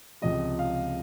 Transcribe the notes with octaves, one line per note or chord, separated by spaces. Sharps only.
C#2 C3 F3 G#3 D#5
F5